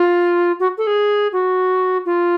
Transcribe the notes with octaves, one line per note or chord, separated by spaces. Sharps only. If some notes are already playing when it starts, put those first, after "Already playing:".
Already playing: F4
F#4
A4
G#4
F#4
F4